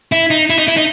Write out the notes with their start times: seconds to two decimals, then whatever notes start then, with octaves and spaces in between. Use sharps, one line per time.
0.12 E4
0.31 D#4
0.50 E4
0.58 D#4
0.68 E4
0.77 D#4